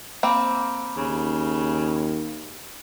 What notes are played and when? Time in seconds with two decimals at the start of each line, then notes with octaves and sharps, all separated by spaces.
0.23 A#3 C4 B5
0.97 D#2 C#3